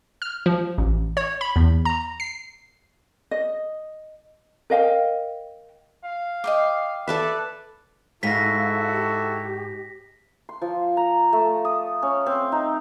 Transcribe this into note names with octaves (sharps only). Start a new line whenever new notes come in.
F6
F3
A1
C#5
B5
E2
A#5
C7
D#5
A#4 D#5 F5 G5
F5
D#5 G5 D6
A4 B4 D5 E5
G#2 G#3 E4 F#4 A4 F5 A#6 B6
G4
C6
F3
A#5
A3
D#6
C#4
C4
D#4